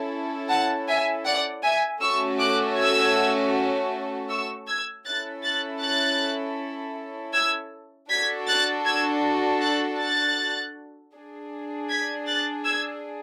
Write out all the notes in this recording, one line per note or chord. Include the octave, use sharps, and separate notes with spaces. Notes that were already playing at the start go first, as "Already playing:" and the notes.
Already playing: C#4 E4 A4
F#5 A5
E5 G#5
D5 F#5
E5 G#5
A3 C#4 F#4 A4 C#6 E6
D6 F#6
E6 G#6
C#6 E6
E6 G#6
C#4 E4 A4 F#6 A6
F#6 A6
F#6 A6
E6 G#6
D4 F#4 A4 G#6 B6
F#6 A6
E6 G#6
F#6 A6
F#6 A6
D4 G#4
G#6 B6
F#6 A6
E6 G#6